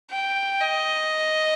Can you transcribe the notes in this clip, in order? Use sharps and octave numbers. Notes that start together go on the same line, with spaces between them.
G5
D#5